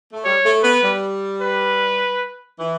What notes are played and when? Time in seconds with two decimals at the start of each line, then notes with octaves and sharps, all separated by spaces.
0.13 A3
0.24 G3 C#5
0.45 A3
0.63 B3 B4
0.83 G3
1.42 B4
2.59 E3